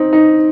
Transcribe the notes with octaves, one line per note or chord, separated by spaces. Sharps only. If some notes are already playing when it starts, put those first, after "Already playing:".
Already playing: C4 D#4
D#4